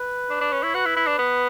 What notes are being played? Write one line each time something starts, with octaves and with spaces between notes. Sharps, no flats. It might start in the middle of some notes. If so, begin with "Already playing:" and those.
Already playing: B4
D4
D4
C#4
E4 C#5
F#4 B4
E4
E4
D4
B3